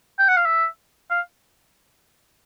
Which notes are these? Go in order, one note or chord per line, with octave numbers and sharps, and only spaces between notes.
G5
F#5
F5
E5
F5